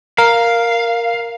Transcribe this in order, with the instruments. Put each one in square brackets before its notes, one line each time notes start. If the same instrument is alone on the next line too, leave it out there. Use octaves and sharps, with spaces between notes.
[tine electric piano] A#4 [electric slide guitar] F5